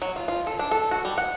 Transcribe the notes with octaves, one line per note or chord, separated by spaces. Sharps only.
F#3
F4
F4
A4
D4
A4
F#4
G3
F#5